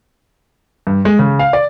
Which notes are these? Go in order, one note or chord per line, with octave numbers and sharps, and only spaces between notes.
G2
G#3
C#3
F5
D5